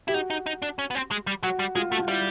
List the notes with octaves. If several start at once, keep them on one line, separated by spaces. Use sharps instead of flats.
E4 G4
D#4 F#4
D#4
D#4
D4
C#4
B3
C4
G#3
G3
F#3 F#4
G3
G#3 F4
A3 F#4
F4
G3 E4